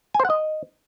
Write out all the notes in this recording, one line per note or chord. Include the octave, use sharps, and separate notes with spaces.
G#5
C5
F#5
D#5